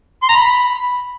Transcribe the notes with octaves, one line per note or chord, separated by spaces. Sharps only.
C6
A#5
B5